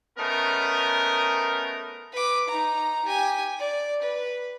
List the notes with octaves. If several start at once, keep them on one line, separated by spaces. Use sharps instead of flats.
A3 B3 C#4 D#4 A#4
B4 D6
D#4 A#5
G4 G#5
D5
B4